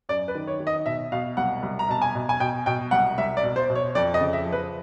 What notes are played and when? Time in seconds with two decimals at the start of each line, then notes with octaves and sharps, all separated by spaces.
0.09 F#2 D5
0.28 B4
0.35 D#3
0.47 C#5
0.60 D#3
0.67 D#5
0.86 B2 E5
1.12 B2 F5
1.37 C2 F#5
1.63 C2
1.79 A#5
1.89 B2 A5
2.02 G#5
2.15 B2
2.29 G#5
2.40 B2 G5
2.66 B2 G5
2.91 C2 F#5
3.18 C2 E5
3.37 D5
3.43 B2
3.56 C5
3.70 B2
3.75 C#5
3.95 F2 D5
4.14 D#5
4.20 C#3
4.33 E5
4.46 F3
4.52 B4